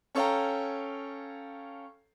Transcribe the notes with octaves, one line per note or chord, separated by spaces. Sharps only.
C#4 A4 C#5 F5 G5 A#5